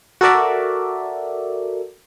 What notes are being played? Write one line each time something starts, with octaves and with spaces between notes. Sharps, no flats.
F#4 A4 A#4 D5 E5